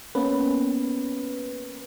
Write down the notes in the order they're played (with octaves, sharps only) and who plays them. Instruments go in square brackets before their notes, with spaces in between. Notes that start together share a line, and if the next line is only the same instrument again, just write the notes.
[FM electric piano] A#3 B3 C#4 B4